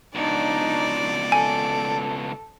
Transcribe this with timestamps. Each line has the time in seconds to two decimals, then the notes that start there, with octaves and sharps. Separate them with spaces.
0.15 C#2 B2 D4 D#4 D5
1.32 A4 G#5